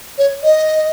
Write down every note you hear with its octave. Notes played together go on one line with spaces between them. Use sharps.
C#5
D#5